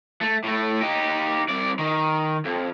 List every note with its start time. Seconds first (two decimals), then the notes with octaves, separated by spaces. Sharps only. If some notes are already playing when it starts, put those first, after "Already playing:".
0.21 A3
0.43 A2 A3
0.81 D#4 G4
1.49 C2 D5
1.79 D#3
2.45 F2